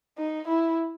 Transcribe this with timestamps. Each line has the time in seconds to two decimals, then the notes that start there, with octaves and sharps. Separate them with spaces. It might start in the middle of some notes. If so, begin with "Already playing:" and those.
0.18 D#4
0.47 E4